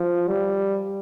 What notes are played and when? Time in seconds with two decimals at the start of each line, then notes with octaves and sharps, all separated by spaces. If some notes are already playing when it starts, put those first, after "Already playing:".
Already playing: F3
0.28 G3